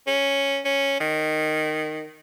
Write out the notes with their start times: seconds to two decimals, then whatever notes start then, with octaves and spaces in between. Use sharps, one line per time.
0.07 C#4
0.65 C#4
1.00 D#3